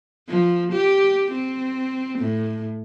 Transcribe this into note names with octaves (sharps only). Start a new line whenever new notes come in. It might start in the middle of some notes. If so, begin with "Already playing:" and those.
F3
G4
C4
A2